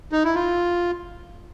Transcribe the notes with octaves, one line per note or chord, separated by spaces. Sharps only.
D#4
E4
F4